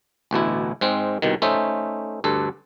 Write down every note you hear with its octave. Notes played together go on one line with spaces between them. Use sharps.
A1 D2 B2 E4
G#2 G#3 C4
C2 B2 D#3
A3 C#4 D#4 C5 E5
D2 G2 A4